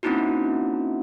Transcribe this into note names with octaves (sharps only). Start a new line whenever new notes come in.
A#3 C4 C#4 D#4 E4 F#4